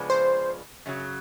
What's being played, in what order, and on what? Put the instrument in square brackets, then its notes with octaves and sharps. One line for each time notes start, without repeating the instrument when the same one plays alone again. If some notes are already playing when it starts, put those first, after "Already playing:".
Already playing: [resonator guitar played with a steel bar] C#3 F3 G#3 B3 D4
[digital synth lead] C5
[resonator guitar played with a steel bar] F#2 C#3 F#3